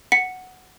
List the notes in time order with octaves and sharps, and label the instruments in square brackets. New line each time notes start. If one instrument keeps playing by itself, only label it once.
[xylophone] F#5 C#7